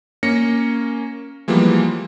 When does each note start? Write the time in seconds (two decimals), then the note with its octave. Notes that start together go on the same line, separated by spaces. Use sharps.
0.23 A#3 C#4 A#6 C#7
1.48 E3 F3 G3 G#3 A#3 B3